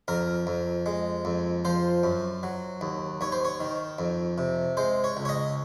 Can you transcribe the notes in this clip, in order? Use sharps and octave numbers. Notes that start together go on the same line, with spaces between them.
F2 A#4
F2
G#3
F2
F3 C5
F#2
F#3
D#2
D#2 C#5
C5
C#5
D#3
F2
C3
G#3 C5
C#5
C#2
C#5
D#5